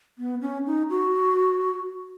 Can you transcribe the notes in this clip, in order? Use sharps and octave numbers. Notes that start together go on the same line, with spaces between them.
B3
C#4
D#4
F#4